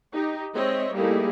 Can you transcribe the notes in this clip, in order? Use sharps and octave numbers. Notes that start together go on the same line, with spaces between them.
D#4 G4
G#3 C4 C#5 D#5 E5
G3 A3 A#3 D#4 E4 G#4